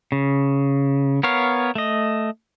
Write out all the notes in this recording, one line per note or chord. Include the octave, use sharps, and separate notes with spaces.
C#3
B3 A#4 C#5 F5
A3 D#5